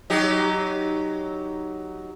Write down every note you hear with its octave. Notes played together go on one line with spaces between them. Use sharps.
F#3 D#4 G4